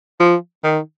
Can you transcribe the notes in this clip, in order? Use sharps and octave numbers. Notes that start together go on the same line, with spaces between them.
F3
D#3